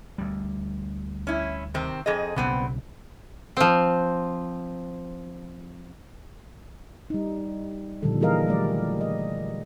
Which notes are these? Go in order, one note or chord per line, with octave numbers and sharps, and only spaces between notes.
D2 G3
C#4 E4
C3 D#3 C4
F2 G#4 D#5
B1 G2 C#3 B3 C4
F3 C4
G3 D#4
A#2 D3 D#3 F3 G3 A4
E3 G3 G#4 A#4 D#5 F5
F#3 G3 A3 D5
D#5